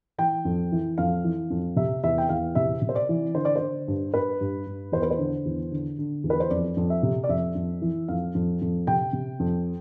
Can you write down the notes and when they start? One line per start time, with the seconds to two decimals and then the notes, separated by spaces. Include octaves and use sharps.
0.18 E3 G5
0.45 F2
0.72 E3
0.98 F2 F5
1.24 E3
1.50 F2
1.76 C3 E5
2.03 E2 E5
2.18 G5
2.29 E2 F5
2.55 C3 E5
2.82 C3
2.89 C5
2.95 D5
3.09 E3
3.35 D3 C5
3.45 D5
3.56 D3 C5
3.88 G2
4.14 G2 B4
4.41 G2
4.66 G2
4.92 E2 C5
5.02 B4
5.11 C5
5.19 D3
5.45 E2
5.72 D3
5.99 D3
6.24 E2
6.30 B4
6.40 C5
6.50 F2 D5
6.77 F2
6.90 E5
7.03 C3
7.24 D5
7.29 F2 E5
7.55 F2
7.82 E3
8.08 F2 F5
8.35 F2
8.61 F2
8.87 C3 G5
9.13 C3
9.40 F2